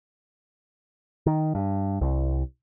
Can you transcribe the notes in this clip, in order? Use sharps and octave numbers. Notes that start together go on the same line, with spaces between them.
D#3
G2
C2